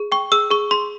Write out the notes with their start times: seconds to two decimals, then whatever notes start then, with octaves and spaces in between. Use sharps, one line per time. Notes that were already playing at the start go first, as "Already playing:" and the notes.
Already playing: G#4
0.12 G5 C#6
0.32 G#4 E6
0.51 G#4 C#6
0.71 G#4 C6